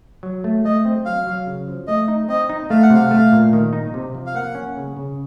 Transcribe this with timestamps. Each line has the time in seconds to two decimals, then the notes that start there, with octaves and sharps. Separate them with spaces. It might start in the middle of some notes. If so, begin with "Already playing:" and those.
0.23 F#3
0.44 A3
0.65 A3 D#5
0.85 C4
1.06 F#3 F5
1.27 F#3
1.47 C#3
1.67 F3
1.87 A3 D#5
2.08 D#4
2.29 C4 D#5
2.49 D#4
2.70 A3 F5
2.82 F#5
2.90 C3 F5
3.11 A3
3.32 A#2
3.53 D#3
3.73 D#4
3.94 C3
4.15 F3
4.27 F5
4.34 A#3 F#5
4.55 C#4
4.76 C#3
4.97 C#3